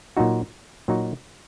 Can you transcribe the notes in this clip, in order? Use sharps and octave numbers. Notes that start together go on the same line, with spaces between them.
A#2 F#3 D#4 F#4
A#2 F#3 D#4 F#4